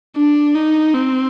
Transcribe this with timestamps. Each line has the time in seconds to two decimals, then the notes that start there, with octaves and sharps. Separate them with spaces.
0.16 D4
0.55 D#4
0.94 C4